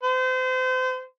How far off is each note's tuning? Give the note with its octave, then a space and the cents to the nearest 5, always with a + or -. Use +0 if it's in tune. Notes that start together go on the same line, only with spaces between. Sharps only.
C5 -35